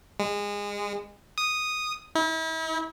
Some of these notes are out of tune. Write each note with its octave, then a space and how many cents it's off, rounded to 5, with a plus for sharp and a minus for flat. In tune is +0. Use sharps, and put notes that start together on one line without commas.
G#3 -25
D#6 -5
E4 -40